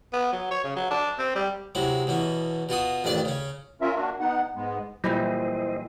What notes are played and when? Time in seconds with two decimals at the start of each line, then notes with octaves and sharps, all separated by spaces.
0.13 B3
0.32 F#3
0.51 C#5
0.64 C#3
0.76 F#3
0.91 D4
1.19 C4
1.35 G3
1.75 C3 F#3 G#3 E4
2.07 E2 B2 E3 C#4
2.69 B2 F4 F#4 D#6
3.04 A1 F2 D#3 D4 D5 A5
3.25 C#3 C#4
3.81 C#4 F4 A#4 E5
3.95 A#3 D4 F#4
4.20 B3 D#4 F#5
4.55 G#2 G#3 B3
5.04 A#2 E3 F#3 G3 A#3 E4 C5 D#5